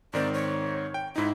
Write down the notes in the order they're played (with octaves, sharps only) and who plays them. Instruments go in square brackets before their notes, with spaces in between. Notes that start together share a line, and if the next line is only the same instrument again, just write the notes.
[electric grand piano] G#2 D#3 C4 [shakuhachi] D5
[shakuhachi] C#5
[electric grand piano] G5
[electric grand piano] G#2 D#4 [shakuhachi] E4